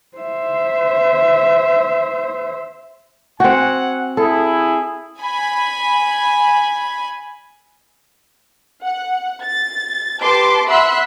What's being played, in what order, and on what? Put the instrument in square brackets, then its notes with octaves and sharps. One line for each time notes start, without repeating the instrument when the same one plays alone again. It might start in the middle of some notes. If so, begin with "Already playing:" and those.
[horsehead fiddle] C5 E5
[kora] C4 F#4 [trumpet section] F#5 G#5
[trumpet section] E4 G#4 [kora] A4
[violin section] G#5 B5
F#5
A6
G4 B4 A5 C6 D6
E5 F#5 B5 C6 E6 F#6